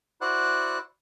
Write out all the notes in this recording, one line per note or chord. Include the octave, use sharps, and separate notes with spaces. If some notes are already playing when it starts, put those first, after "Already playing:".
E4 F#4 C5 D5 F#5 F#6